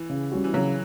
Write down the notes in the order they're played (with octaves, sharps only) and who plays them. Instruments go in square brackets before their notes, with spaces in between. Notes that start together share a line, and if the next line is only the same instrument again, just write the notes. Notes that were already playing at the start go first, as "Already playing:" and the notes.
Already playing: [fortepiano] E3
[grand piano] C#3
G3 C#4 F#4
[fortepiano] E3
[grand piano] C#3 [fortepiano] F#3